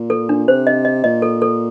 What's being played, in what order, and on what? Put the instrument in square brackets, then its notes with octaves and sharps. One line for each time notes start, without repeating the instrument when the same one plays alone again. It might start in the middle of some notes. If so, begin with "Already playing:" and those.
Already playing: [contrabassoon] A#2
[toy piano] A4
D4
[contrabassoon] C3 [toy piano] C5
[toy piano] D#5
D#5
[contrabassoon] A#2 [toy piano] D#5
[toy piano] A4
A4